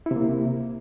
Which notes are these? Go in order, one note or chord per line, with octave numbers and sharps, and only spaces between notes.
C3 A#3 E4